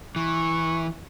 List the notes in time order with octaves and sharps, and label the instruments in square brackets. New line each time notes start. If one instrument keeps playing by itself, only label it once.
[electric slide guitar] E3 [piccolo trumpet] C#6